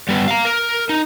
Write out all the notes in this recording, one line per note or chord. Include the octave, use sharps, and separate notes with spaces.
G3 B3
F5 A#5
A#4
D#4